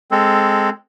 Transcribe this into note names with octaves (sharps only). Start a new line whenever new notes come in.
G#3 C4 A4